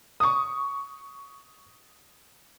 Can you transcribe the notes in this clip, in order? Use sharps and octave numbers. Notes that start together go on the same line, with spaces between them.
C#6 D#6